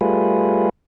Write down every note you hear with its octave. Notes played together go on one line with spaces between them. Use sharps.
G3 A3 F4 G#4 B4